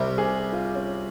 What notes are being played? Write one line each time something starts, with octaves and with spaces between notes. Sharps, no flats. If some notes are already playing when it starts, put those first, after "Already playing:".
Already playing: C2 C3 G3 C5
G#4
F4
C#4